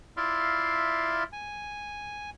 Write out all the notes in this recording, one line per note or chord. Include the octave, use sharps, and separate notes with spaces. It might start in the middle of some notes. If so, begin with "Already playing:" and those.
E4 F4 D5 E5 F5 C6
G#5